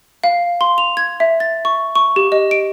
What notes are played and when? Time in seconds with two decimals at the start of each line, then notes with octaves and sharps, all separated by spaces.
0.24 F5
0.61 C6
0.78 F7
0.97 G#6
1.20 E5
1.40 A6
1.65 C#6
1.95 C#6
2.16 G4
2.32 D#5
2.51 D7